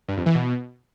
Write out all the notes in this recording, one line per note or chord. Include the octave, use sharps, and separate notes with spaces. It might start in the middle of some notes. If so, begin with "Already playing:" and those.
G2
F2
E3
B2